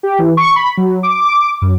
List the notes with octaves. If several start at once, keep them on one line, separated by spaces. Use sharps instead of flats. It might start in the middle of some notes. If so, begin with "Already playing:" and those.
G4
E3
C#6
B5
F#3
D6
D6
F#2